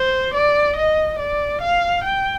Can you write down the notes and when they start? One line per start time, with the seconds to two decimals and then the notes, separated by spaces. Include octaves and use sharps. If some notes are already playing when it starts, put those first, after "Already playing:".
Already playing: C5
0.34 D5
0.77 D#5
1.19 D5
1.62 F5
2.04 G5